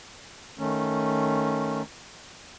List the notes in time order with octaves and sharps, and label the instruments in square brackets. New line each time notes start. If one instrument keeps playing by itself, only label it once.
[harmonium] D#3 A3 C#4